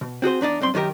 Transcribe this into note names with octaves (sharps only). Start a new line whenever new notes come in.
B2
C4 F#4 G#4 C5
E2 D4 D#4 D5
B1 G2 C4 C6
F#2 D#3 D#4 G4 A#4